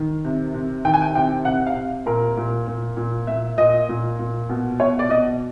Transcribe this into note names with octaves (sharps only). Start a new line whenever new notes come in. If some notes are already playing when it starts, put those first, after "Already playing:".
Already playing: D#3
C3
C3
D#3 G5
G#5
G5
C3 G5
C3 F#5
F5
C3
A#2 A#4
A#2
A#2
A#2
A#2 E5
A#2 D#5
A#2
A#2
B2
B2 C#5
D5
B2 D#5